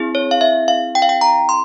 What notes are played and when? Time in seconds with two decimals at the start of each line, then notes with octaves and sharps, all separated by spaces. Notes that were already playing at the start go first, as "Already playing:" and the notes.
Already playing: C4 E4 G#4
0.15 C#5
0.31 F5
0.41 E5
0.68 F5
0.95 G5
1.02 F5
1.09 G5
1.21 A#5
1.49 C6